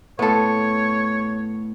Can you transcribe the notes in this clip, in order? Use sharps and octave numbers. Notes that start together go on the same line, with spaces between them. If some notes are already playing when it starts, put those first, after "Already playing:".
A2 B3 A4 C#5 C6